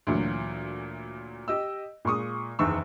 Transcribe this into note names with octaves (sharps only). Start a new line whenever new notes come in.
D2 A#2 E3 F#3
G4 D#5 E6
A#2 G#3 C#6 D#6
F#1 E2 D#3 C#6 E6